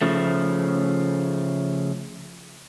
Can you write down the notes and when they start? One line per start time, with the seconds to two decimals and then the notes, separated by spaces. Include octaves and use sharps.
0.02 C#3 F3 A3